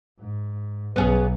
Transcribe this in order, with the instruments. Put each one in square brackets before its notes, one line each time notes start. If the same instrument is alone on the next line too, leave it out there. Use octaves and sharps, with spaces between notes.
[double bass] G#2
[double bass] B1 [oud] B3 C#4 G#4